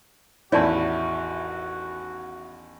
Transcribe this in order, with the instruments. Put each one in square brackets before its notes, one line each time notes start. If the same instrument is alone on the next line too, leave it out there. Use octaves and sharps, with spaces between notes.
[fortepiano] A1 E2 D#3 [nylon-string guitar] E4 [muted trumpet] F#4 [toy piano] C#5 D5 A5